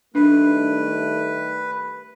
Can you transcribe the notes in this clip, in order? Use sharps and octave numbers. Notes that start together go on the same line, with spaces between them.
D#3 G3 A3 D4 B4